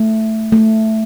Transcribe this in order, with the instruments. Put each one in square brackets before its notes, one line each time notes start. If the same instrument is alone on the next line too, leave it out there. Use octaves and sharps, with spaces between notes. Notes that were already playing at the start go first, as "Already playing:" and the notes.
Already playing: [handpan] A3
A3